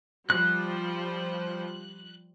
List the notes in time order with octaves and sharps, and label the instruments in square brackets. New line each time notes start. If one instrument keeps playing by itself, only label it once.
[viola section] F3 G3 C5 [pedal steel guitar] F#6